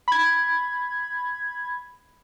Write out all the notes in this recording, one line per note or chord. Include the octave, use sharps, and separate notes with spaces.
B5 G#6